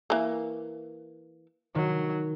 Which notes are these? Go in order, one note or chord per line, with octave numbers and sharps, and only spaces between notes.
E3 A#3
D#3 F#3